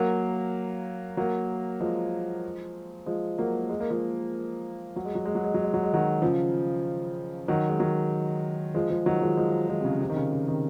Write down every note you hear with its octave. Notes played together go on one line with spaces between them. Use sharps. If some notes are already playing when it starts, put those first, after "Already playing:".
Already playing: F#3 A#3
F#3 A#3
F3 G#3
F3 G#3
F#3 A#3
G#3
A#3
F3 G#3
F#3
G#3
F#3
G#3
F#3
G#3
F#3
G#3
F#3
G#3
D#3 F#3
C#3 F3
D#3 F#3
G#3
D#3 F#3
F3 G#3
F3 G#3
D#3 F#3
F3 G#3
F3 G#3
F3 G#3
C3
C#3
C3
D#3
C#3
C#3
C3 D#3